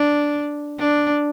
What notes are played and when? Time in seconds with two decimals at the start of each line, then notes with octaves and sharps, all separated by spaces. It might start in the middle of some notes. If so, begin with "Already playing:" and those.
Already playing: D4
0.79 D4